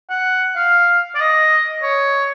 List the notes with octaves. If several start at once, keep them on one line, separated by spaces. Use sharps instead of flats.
F#5
F5
D5
D#5
C#5